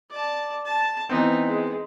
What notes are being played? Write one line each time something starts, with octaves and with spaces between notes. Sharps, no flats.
D5 A5
A5
E3 B3 C4 D#4
G#3